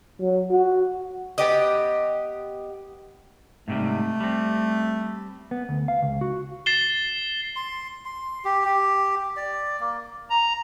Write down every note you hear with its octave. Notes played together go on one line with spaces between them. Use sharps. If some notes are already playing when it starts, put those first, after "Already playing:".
F#3
F#4
B3 G4 D#5
G#2 C3 G3 A3
G3 C4
B3
D2
F5
C#2
F#4
A6 C7 E7 G7
C6
C6
G4
G4
D5
A#3
A#5